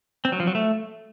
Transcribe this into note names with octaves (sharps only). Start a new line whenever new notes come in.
C4
F#3
F3
F#3
A3